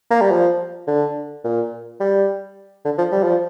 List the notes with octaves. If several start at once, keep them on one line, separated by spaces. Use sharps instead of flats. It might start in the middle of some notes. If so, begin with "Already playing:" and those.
A#3
G3
F3
D3
A#2
G3
D3
F3
G3
F3